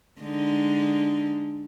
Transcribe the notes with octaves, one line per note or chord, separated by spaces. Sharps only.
D3 G#3 D#4